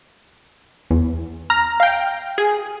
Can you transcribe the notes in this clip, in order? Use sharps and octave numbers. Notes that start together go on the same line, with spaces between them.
E2
A#5 F6 A#6
F5 G5
G#4